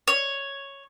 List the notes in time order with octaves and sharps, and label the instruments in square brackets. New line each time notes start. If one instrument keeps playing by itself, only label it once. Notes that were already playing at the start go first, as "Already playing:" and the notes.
[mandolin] C#5